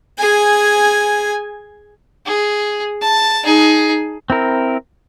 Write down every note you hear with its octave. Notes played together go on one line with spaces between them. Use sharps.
G#4 G#5
G#4
A5
D#4 G#4
C4 E4 A#4